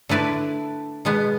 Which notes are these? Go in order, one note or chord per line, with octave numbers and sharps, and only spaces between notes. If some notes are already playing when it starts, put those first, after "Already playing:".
D3 A3 E4 B4 D5
B2 G#3 B3